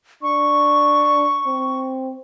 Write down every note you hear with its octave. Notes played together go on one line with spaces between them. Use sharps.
D4 C#6
C4